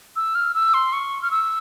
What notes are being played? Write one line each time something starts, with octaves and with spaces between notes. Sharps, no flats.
E6
F6
E6
C6
C#6
F6
E6